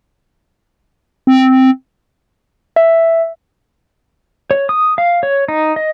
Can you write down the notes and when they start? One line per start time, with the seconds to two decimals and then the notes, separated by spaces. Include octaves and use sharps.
1.27 C4
2.76 E5
4.51 C#5
4.69 D#6
4.98 F5
5.23 C#5
5.48 D#4
5.76 D#5